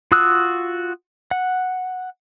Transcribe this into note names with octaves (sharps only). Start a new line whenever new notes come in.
F4 F#4 D#6 E6 F#6
F#5